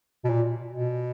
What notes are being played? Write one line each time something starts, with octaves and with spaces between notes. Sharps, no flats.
B2
A#2
B2